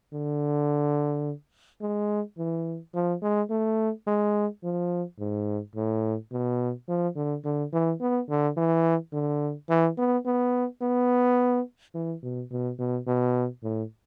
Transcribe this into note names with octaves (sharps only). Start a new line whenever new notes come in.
D3
G#3
E3
F3
G#3
A3
G#3
F3
G#2
A2
B2
F3
D3
D3
E3
B3
D3
E3
D3
E3
B3
B3
B3
E3
B2
B2
B2
B2
A2